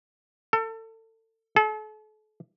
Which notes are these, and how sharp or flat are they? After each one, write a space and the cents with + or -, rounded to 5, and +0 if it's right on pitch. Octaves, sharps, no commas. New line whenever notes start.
A4 +30
A4 -40